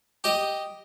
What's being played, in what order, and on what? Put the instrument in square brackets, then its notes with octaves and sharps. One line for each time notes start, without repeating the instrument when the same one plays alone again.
[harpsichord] G4 D#5